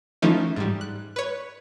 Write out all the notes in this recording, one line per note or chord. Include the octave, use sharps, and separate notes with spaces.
E3 F3 A3 C#4 D#4
G#2 G3
F#6
B4 C#5